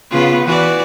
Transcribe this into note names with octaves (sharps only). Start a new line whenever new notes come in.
C#3 B3 F4
E3 F#4 D5